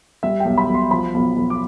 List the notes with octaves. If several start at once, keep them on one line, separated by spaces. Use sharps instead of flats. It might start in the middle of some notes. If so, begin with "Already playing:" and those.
G3 E5
B1 G5
B5
B1
C6
F3 B5
B1
B1
D6